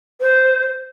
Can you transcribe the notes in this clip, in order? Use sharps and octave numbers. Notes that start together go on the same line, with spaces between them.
C5